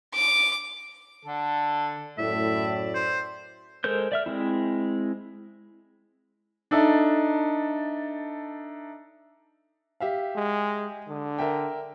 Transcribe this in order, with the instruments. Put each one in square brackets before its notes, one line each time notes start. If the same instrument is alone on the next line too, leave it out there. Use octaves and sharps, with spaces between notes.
[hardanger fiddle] D6
[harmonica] D3 A4
[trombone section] F#2 A2 [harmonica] D5 [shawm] E5
[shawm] C5
[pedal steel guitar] G#3 A4 A#4 C5 G6
D5 E5 F6
G#3 C4 E4
[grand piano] D4 D#4 A4 E5
[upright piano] G4 E5 F5
[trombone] G#3
D3
[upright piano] A#4 E5 G5